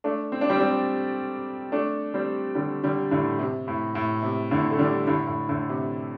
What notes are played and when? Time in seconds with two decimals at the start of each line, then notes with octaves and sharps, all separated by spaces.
0.04 A3 D4
0.32 C4
0.41 D4
0.50 G3 C4
0.60 G3 C4
1.72 A3 D4
2.14 G3 C4
2.55 D3 G3
2.84 D3 G3
3.11 A2 D3
3.39 C3
3.68 A2
3.95 A2
4.22 C3
4.51 A2 D3
4.71 A3
4.79 D3 G3
5.07 A2 D3
5.27 A2
5.49 A2 D3
5.69 C3